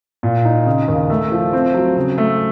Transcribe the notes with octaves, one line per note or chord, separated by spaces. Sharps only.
A#2
D#4
C#3
D#2
A3
F3
C4
F#3
C#3
A3